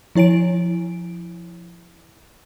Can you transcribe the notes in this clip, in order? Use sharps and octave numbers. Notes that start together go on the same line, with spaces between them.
F3 E4 C#5 G#5 D7